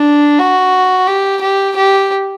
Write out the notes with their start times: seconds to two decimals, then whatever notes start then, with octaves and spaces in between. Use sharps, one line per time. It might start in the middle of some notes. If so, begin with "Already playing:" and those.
Already playing: D4
0.39 F#4
1.07 G4
1.41 G4
1.76 G4